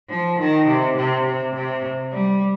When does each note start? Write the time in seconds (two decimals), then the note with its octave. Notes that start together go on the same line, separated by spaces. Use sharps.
0.09 F3
0.39 D#3
0.67 C3
0.97 C3
1.25 C3
1.55 C3
2.12 G3